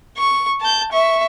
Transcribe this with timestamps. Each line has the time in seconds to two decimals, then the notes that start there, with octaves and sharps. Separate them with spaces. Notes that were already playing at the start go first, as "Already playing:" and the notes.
0.17 C#6
0.61 A5 G6
0.92 E5 C#6